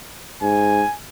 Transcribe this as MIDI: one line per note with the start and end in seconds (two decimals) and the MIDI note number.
0.42 0.83 44
0.42 0.94 80